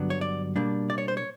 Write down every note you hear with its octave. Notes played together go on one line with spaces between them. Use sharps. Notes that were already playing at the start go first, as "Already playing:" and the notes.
Already playing: G2 D3 F#3 B3 D4
C#5
D5
B2 G3 A#3 D4
D5
C#5
C5
C#5